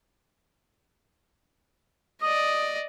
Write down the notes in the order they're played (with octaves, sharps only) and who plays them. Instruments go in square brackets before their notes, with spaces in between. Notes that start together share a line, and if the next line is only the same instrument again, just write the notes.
[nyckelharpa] D5 D#5 [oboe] D#6